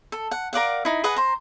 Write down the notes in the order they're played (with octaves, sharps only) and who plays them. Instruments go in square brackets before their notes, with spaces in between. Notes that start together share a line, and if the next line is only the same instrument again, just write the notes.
[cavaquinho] A4
F#5
A#4 D5 F5 F#5
D#4 E4
G#4 B4 D#5 F#5
C5 A#5